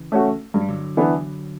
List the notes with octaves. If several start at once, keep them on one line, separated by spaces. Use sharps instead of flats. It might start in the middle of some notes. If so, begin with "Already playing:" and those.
Already playing: C#3 E3
A3 C#4 F#4
G2 F#3
G3
D3 F#3
E3 B3 D4